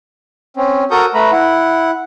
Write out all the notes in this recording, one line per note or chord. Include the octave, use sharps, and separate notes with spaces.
C4 C#4
F#4 A4 A#4 C#6 D#6 G6
A3 B4 A#5 B5
E4 F#5